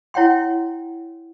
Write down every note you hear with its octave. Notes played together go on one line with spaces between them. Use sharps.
E4 C#5 F#5 G5 C6